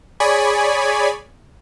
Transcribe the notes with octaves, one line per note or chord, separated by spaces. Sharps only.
G#4 C#5 D5 G#5 B5